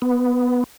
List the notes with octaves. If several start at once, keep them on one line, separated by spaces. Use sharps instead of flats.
B3